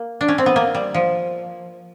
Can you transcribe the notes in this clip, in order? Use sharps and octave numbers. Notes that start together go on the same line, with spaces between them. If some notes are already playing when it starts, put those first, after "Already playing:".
Already playing: A#3
D4
C#4
C4
B3
A#3
G3
F3